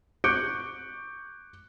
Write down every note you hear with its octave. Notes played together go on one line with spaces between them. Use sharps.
C#6 D6 F#6 G6 C#7 D7